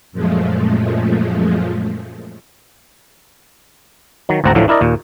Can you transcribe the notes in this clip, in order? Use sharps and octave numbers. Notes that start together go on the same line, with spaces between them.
F#2 A#2 F3 G#3 A3
D#3 F#3
G#1 D2 C4 F#5 A5 A#5
A1 D2 A2 D3 F3 F#3
D4 E4 A#4 D5 D#5
D#2 A#2